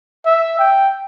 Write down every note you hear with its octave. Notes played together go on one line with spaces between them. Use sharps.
E5
G5